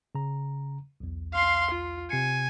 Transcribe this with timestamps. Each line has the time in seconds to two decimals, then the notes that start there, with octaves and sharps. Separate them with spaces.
0.15 C#3 A#5
1.00 B1 E2
1.34 F5 C6
1.71 F4
2.10 C3 G#5 C7 C#7